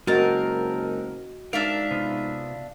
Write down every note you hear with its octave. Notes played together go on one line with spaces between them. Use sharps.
F#1 G#3 C4 D#4 F#4 A#4 D#5 A5
G#2 D4 A#4 E5 F5 A5
C3 B3 F4